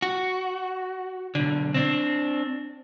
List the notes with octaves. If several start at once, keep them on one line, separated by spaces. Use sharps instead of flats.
F#4
B1 D3
C4 D4